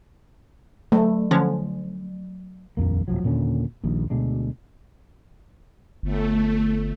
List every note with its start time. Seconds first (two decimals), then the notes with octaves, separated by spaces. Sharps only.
0.92 F#3 A3
1.31 D3 F3 C#4
2.77 D#1 A#1 F2 A#3
3.08 D#1 G#1 F3 F#3
3.23 D#2 A#2 D3 C#4
3.84 D#1 A#1 D#2
4.10 D2 B2 G#3 D4
6.03 G1 A3